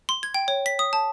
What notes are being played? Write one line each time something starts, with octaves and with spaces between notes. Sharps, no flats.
C6
G#6
G5
C#5
B6
D#6
A5